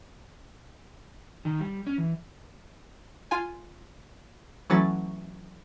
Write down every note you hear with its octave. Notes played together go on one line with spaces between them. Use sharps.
D#3
G3
C#4
E3
F4 G#5
E3 F#3 A3 C#4 A6